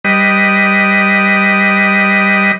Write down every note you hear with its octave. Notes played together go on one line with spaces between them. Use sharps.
G3 B4 D#5